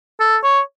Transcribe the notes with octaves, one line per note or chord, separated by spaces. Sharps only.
A4
C#5